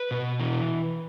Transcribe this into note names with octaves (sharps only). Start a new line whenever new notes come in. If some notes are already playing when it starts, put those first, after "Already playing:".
Already playing: B4
B2
E3